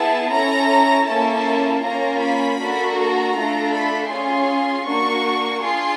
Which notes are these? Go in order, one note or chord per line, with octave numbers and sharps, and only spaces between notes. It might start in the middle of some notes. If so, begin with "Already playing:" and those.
Already playing: B3 E4 G#4 A5
C#4 E4 A4 A#5
A#3 C#4 E4 A4 A5
A#3 C#4 F4 A#5
B5
A#3 D4 F#4 A4
A#5
A3 D4 F4 A4
B5
C#4 F4 G#4 C6
A#3 D4 F#4 C#6
D4 F4 G#4 C6